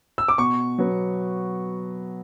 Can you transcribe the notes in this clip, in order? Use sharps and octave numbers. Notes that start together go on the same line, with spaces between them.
E6
D6
B2 C#6
F#3 B3